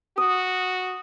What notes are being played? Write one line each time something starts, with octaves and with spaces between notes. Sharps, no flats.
F#4 D#6